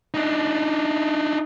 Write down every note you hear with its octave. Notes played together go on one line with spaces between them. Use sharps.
D4 D#4